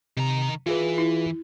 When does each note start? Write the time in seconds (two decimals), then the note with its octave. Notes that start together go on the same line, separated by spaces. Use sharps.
0.17 C3 D#3 A#5
0.66 E3 F4 G#4 B4
0.98 E4